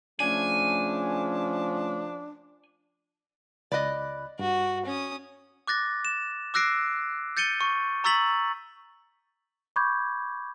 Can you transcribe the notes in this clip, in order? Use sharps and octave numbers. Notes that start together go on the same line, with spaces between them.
C#3 F3 A3 C#4 D4 G#5
C#2 D5 D#5 B5 F#6
G2 F#4
C#4 D#6
D6 F#6 A6 A#6
E7
D6 E6 F#6 A#6 C7 D7
G6 A6 C#7 D#7 G7
C#6
A#5 C#6 E6 A6 B6 F#7
B5 C#6 D6 G6 G#6